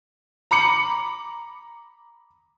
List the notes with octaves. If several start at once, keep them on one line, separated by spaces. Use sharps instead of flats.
A#5 B5 D6 C#7 F#7